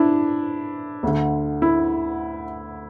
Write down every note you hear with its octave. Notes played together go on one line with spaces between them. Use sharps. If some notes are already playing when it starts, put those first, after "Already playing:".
Already playing: D4 E4
D2 D3
E4